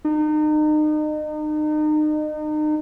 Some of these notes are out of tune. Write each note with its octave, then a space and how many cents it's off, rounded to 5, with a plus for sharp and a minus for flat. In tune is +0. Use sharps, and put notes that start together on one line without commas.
D#4 -35